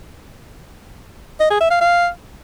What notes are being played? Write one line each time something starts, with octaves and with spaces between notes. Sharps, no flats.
D#5
G#4
E5
F5
F5